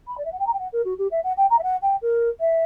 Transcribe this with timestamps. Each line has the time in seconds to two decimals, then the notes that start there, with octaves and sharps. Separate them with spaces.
0.07 B5
0.17 D5
0.25 E5
0.32 F#5
0.39 G5
0.46 A#5
0.53 G5
0.59 F#5
0.72 A#4
0.85 F#4
0.98 G4
1.11 E5
1.24 F#5
1.37 G5
1.50 A#5
1.58 E5
1.63 F#5
1.82 G5
2.02 A#4
2.40 E5